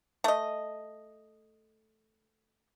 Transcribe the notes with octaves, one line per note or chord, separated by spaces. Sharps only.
A3 D#5